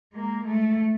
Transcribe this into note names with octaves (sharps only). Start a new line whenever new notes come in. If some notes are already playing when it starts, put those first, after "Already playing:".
G#3 A#3
A3